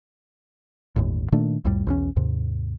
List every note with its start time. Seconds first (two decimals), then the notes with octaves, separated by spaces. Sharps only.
0.96 G1 D#2 A2
1.32 A#2 D#3 A3 D4
1.65 C2 F2 A2 G3
1.87 B1 E2 C#4
2.16 D#2 G#2 C3